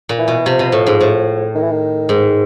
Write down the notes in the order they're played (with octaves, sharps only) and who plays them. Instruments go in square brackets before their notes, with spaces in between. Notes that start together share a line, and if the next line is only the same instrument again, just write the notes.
[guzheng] A#2
[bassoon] E3
[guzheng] B2
[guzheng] C3 [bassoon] F3
[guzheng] B2
A2
G#2
A2
[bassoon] D#3
E3
D#3
[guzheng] G#2